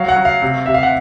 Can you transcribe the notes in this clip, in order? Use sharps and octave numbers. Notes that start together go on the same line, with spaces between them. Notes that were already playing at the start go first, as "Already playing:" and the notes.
Already playing: F#3 F5
F#5
F#3
F5
C3
C3 E5
F5
F#5